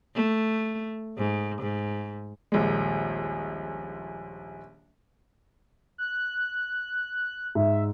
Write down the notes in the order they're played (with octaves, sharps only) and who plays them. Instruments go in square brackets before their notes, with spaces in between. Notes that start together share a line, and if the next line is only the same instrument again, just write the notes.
[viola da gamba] A3
G#2
G#2
[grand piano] D#1 A#1 G#3
[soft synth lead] F#6
[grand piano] G#2 [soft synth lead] E5